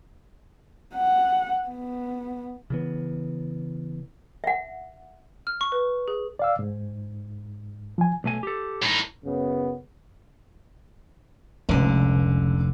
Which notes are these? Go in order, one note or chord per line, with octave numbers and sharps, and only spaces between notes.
F#5
B3
C#3 E3 B3
E5 F#5
F6
C#6
B4
G#4
D5 F5 E6
G#2
F3 G#5
B1 A3 G#5
G4 A4
A2 D#4
F#2 C#3 B3
F1 C#2 D3